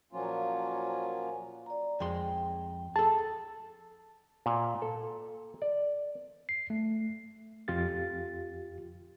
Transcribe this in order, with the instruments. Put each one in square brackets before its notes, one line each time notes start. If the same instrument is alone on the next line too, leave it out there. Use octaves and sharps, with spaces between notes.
[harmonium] A#2 F3 F#3 A#3 C#4 F4
[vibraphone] D5 A#5
[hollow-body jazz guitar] F2 G#3 C6 [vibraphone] G5
[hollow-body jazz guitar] G#4 A4 [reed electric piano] A5
[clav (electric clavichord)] A#2
A4
D5
[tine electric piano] C7
A3
[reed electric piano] F2 F4 G4 A6